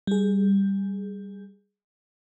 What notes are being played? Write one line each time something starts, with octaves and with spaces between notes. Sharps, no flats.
G3 G#4